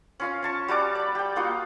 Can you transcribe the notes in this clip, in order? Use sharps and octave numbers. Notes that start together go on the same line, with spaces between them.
C#4 F4 F5
C#4 A5 C#6
G3 F#4 A5 D6
D5 B5
G4 G5
A#3 D#4 F4 F#4